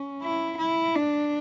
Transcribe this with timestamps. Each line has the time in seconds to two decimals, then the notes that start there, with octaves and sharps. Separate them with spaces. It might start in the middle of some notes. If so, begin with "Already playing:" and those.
Already playing: C#4
0.22 E4
0.58 E4
0.96 D4